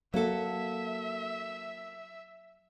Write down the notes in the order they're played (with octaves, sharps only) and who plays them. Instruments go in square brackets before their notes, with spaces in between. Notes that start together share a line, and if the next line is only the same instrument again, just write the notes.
[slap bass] F#3 [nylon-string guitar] A#3 F#4 A4 [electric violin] E5